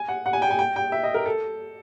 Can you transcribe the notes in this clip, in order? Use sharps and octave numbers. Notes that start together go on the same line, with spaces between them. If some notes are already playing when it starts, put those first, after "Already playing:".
Already playing: G#5
F#5
F#5
G#5
G5
G#5
G5
G5
E5
D#5
A#4
A4